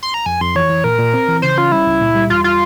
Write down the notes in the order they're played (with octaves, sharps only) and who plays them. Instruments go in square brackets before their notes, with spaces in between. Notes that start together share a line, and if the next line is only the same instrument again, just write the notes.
[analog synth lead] C6
A#5
[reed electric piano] F2 [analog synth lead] G#5
[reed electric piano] F2 [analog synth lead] C6
[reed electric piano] E3 [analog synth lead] C#5
[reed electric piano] E3
[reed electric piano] A#2 [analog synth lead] A#4
[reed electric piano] A#2
C4
E3
[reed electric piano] C#3 [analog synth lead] C5
[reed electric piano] C#4 [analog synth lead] F4
[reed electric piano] G3 [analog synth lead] E4
[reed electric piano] C#2
A#2
G3
[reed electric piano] E2 [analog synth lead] F4
[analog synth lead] F4